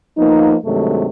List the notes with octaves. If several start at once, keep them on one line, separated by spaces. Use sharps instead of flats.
F3 A#3 B3 D#4
G2 C3 D#3 F#3 G#3 A3